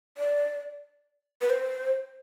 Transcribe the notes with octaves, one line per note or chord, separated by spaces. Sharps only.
D5
B4
C5